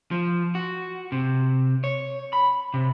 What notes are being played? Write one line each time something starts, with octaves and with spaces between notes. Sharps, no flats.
F3
F#4
C3
C#5
B5
C3